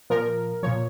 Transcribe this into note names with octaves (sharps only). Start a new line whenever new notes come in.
A#2 F3 A#4
A#2 F3 C#5